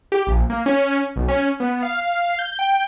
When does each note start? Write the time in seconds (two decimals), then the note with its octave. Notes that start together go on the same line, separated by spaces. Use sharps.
0.12 G4
0.27 A#1
0.50 A#3
0.66 C#4
1.16 B1
1.28 C#4
1.60 B3
1.82 F5
2.39 G6
2.59 G5